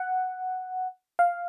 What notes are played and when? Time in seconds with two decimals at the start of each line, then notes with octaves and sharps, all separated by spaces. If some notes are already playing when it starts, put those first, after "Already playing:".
Already playing: F#5
1.19 F5